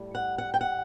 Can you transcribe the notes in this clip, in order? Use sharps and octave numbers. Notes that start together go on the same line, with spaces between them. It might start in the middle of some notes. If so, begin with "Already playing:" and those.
Already playing: A2 G3
F#5
F#5
G5
F#5